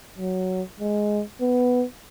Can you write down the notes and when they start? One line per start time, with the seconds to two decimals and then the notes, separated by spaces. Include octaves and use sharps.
0.18 F#3
0.80 G#3
1.41 B3